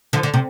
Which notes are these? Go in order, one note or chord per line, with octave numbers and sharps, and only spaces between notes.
D3 F3
D3
C3